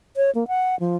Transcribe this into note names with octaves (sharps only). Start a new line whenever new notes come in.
C#5
A#3
F#5
F3